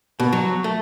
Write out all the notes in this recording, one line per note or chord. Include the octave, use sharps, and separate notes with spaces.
B2
F#3
A3